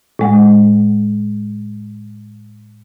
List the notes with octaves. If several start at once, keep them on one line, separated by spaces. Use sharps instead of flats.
A2 G#3 F#5